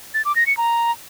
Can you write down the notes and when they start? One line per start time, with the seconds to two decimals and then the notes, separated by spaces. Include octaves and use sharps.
0.14 A6
0.25 D6
0.36 A#6
0.47 C#7
0.57 A#5